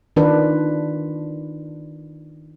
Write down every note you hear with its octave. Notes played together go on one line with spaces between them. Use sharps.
D#3 D4 F4 B4